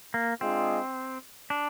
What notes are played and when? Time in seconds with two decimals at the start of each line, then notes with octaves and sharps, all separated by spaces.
0.14 A#3
0.41 G#3 C4 D4 F4 G#4 D#5
1.50 D4